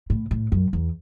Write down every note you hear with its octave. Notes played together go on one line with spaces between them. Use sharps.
A2
A2
F#2
E2